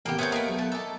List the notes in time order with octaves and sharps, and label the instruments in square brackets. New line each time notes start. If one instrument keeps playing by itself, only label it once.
[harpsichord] A1 D#3 B3 [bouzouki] A#3 G4
[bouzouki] A3 B3 [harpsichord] C4 A#4 C5 [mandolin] C#5 G6
[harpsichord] A#3 D#5 F5 [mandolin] A#4 B4
[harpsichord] B1 C#6
[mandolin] A5
[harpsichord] D#4 D6 [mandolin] A4 A5